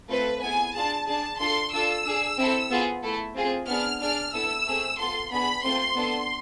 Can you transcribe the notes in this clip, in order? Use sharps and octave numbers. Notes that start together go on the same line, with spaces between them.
A3 C4 F4 A4 B4
B3 E4 G#4 G#5
D4 F4 G#4 A5
D4 G#4 A5
D4 F4 A4 C6
D4 F4 A4 E6
D4 G#4
C4 E4 A4
B3 F4 G#4
A3 E4 A4
C4 F4 G#4
B3 D4 G#4 F6
D4 G#4 F6
B3 E4 A4 E6
A3 C4 G#4
B3 F4 A4 C6
B3 D4 G#4 B5
A3 C4 F4 C6
B3 D4 A4